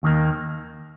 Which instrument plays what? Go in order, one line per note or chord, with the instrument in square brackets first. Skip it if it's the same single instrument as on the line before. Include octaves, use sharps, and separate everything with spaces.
[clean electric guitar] D#2 D#3 A#3